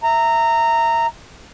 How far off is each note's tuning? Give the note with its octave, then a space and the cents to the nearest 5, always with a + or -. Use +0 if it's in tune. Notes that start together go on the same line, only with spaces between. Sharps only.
E5 +0 A#5 -15